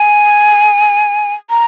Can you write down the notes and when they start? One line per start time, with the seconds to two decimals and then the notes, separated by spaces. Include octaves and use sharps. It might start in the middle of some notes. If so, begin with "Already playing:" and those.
Already playing: G#5
1.50 A#5